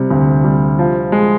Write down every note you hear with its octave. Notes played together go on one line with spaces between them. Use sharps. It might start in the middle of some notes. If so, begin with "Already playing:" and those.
Already playing: C3 G3
D2
G3
F3
G#3